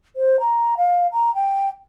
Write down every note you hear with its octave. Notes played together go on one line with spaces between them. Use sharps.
C5
A#5
F5
A#5
G5